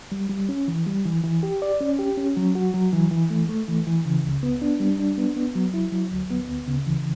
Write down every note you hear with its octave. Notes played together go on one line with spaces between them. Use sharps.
G3
G3
C#4
E3
G3
E3
E3
G4
D5
C#4
G4
C#4
F#3
F#4
F#3
E3
E3
A3
A3
E3
E3
C#3
C#2
B3
D4
G3
D4
B3
B3
F#3
E4
F#3
D2
B3
D2
C#3
E3